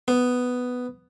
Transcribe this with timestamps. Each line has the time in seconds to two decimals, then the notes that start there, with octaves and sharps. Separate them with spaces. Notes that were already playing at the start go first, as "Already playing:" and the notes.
0.08 B3